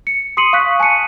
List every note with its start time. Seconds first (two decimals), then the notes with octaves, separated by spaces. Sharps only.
0.07 C#7
0.37 C6 D#6 C7 C#7 D#7 F#7
0.53 F5 C#6 D#6 F#6 B6
0.80 G#5 A5 C#7 D#7